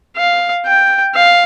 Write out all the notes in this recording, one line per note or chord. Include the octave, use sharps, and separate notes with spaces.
F5
G5
F5